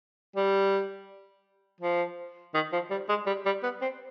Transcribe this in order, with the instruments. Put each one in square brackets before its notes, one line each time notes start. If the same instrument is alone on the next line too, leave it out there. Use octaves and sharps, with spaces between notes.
[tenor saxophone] G3
F3
D#3
F3
G3
G#3
G3
G3
B3
C4